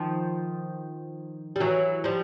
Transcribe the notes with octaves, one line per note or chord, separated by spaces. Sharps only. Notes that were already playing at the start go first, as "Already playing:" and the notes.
Already playing: D#3 F3
G3
E3 F#3
F3 G3